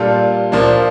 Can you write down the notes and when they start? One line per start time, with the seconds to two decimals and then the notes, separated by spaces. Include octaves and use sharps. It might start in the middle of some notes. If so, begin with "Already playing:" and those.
Already playing: A#2 G3 D4 F4 A4
0.52 A#2 F3 A#3 D4